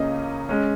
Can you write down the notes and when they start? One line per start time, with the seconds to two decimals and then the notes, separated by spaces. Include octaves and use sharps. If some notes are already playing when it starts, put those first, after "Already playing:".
Already playing: C#2 C#3 A#3 C#4 D#5
0.49 G#3 C#4